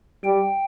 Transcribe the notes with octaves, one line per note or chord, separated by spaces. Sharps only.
G3 G5